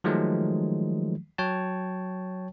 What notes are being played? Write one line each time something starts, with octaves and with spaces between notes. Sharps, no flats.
D#3 F3 F#3 G#3 A3
F#3 C#5 G5 A5